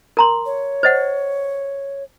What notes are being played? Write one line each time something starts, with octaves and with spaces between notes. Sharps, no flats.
A#4 A#5 C6
C#5
C5 D#5 F#5